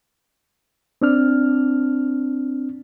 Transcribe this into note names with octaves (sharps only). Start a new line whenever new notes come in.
C4 D4 F6